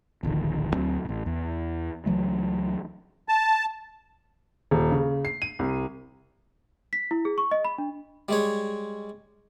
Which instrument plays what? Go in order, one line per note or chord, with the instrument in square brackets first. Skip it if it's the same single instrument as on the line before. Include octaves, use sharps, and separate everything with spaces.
[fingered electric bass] D1 A#1 D3 D#3
D2 F#3 C4
A1 A#2
E2
C#2 E3 F#3 A3
[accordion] A5
[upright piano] D#1
C#3
C7
D#7
C2
[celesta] B6
E4
G#4
C#6
D#5
B5
D4
[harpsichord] G3 G#3 C#5